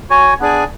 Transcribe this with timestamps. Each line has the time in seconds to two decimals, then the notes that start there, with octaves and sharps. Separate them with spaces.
0.10 F#4 C#5 G#5
0.40 B3 D4 G#4 D5 G#5